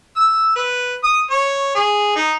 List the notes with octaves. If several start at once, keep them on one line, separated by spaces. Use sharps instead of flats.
E6
B4
D#6
C#5
G#4
D#4